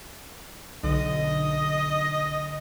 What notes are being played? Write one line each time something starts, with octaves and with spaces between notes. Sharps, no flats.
B1 D3 D#5